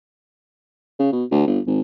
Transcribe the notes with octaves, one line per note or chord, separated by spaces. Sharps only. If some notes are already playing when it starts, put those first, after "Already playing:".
C#3
B2
D2
G1
G#1